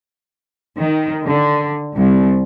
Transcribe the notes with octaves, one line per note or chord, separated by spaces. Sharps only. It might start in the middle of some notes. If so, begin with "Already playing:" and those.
D#3
D3
C2